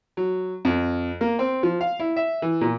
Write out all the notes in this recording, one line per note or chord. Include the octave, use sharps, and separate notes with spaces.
F#3
F2
A#3
C4
F3
F5
E4
E5
E3
A#2